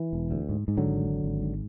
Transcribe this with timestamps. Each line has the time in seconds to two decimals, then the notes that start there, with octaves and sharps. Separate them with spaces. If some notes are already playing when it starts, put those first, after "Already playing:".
Already playing: E3
0.13 E1
0.31 D2
0.49 G#2
0.68 G#2
0.77 D3 F#3
0.87 G#1
1.05 G#1
1.24 G#1
1.42 G#2